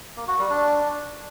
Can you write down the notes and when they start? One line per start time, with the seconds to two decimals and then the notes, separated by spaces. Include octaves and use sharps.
0.17 A#3
0.28 F#4
0.39 G3
0.50 D4